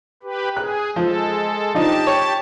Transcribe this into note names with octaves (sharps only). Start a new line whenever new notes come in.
G4 B4
G#4 F#6
F3 G#3 A4
F3 D4 D#4 G4 A5
C#5